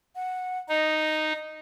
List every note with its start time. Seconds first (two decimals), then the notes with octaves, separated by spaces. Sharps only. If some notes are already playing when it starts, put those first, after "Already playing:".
0.15 F#5
0.69 D#4 D#5